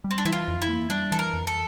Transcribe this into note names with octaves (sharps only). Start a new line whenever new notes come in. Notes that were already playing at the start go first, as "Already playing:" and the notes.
G3
C4
D4
E3 E4
F4
F2
E4
A#3
G3 D4
E3 A4
A#4
F2
A4